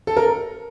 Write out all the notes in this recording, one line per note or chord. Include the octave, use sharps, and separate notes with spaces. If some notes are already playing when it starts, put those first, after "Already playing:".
A4
A#4